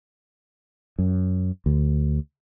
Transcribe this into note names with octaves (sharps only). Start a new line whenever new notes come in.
F#2
D2